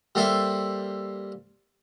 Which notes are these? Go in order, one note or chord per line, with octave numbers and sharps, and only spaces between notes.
G3 A#3 A4 C5 E5 F5